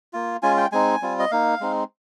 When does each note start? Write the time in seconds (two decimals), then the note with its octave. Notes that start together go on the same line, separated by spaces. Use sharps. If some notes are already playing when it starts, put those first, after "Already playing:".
0.13 A#3 F4
0.42 G#3 C#4 F4 G#5
0.57 G5
0.72 G#3 C4 D#4 G#5
1.01 G3 C4 F4
1.19 D#5
1.31 A#3 D#4 F5
1.60 G#3 C4 D#4